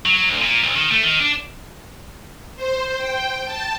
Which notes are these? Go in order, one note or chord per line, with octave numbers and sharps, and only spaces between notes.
F#3
D2
A#2
B1
D#3
A3
D#3
D4
C5
G5
A5